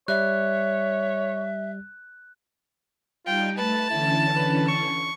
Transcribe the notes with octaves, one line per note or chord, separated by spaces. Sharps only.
G3 C#5 E5 F#6
G3 D#4 F4 G5
A3 B4 A5
D3 E3 C#4 E4
B4
C#6